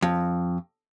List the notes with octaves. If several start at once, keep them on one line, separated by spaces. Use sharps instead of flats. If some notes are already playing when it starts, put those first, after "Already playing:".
F2